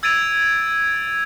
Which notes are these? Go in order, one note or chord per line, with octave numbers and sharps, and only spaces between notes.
E6 G#6 A6 D7 D#7 F7